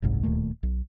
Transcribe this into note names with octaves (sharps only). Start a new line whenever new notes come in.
F#1 C2 G#2
D1 D#2 A#2 A3
B1